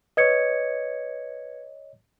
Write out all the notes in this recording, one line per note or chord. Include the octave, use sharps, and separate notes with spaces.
B4 C#5 D#5 G#6 C#7